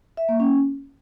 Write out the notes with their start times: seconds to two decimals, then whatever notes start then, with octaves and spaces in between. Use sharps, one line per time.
0.17 E5
0.29 A#3
0.40 C#4